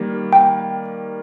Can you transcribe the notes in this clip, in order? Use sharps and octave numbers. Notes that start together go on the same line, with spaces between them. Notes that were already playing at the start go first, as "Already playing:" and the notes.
Already playing: D#3 G3 A#3
G5